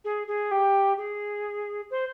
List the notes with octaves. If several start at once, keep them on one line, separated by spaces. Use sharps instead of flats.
G#4
G#4
G4
G#4
C5